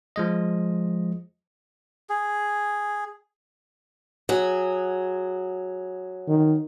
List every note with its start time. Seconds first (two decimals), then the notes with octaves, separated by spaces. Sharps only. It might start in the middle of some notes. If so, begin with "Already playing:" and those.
0.16 F3 G#3 D#5
2.09 G#4
4.29 F#3 G#4
6.28 D#3